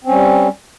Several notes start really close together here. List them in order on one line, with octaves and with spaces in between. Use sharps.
C4 C#4 G3